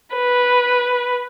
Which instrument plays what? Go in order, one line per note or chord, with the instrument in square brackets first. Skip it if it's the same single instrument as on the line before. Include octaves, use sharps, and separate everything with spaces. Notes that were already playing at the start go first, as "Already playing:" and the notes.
[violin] B4